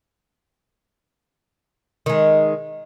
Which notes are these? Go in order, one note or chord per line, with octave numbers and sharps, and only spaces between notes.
D#3 G#3